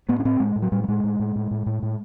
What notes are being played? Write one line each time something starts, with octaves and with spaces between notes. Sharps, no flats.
A2 B3
C#4
A2 C4
A2 G#3
A2
F#3
A2 G3
G3
A2 G#3
A2
A2
A2
A2
A2
A2